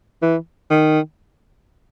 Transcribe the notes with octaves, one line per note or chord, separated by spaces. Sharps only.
E3
D#3